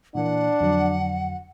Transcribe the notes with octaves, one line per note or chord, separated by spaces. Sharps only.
A#2 E3 A#3 D4 F#5
F2 D3 F#3